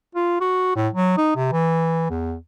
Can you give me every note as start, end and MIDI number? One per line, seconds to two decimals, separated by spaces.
0.16 0.37 65
0.41 0.76 66
0.76 0.88 45
0.93 1.13 54
1.18 1.35 63
1.36 1.48 48
1.52 2.07 52
2.10 2.36 40